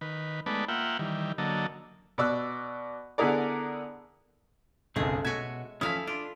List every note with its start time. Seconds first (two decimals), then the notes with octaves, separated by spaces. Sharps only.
0.01 D#3 B4
0.46 G#3 A3 B3 D#4 B4 D5
0.68 A#3 F4 E5 F#5 G5
0.99 D#3 E3 G3
1.38 D3 F#3 A#3 A4 D#5
2.18 B2 D5 E6 F#6
3.18 D3 B3 E4 G#4 A#4 D5
4.96 F#1 B1 G#3 A3 C4 G#4
5.25 B2 F#4 C#5 E5 G#5 G#6
5.81 E3 F3 C#4 E4 A4 F5 D#6 B6
6.07 D4 F4